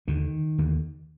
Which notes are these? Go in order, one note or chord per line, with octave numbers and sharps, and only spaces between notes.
D#2 D3 D#3
D#2 D3